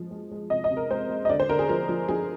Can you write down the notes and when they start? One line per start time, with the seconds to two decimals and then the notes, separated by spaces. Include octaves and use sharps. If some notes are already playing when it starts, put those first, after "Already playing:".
Already playing: F3 G#3
0.11 G#3
0.32 G#3
0.50 C3 D#5
0.64 D#5
0.71 C3
0.77 A#4
0.90 G#3 C5
1.10 G#3
1.25 D#5
1.29 D3 D5
1.40 C5
1.49 D3 A#4
1.59 G#4
1.69 F3 A#4
1.89 F3
2.08 F3 G#4